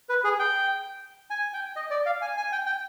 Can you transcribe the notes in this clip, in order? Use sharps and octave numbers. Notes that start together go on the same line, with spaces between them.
B4
G#4
G5
G#5
G5
D#5
D5
F5
G#5
G#5
G5
G5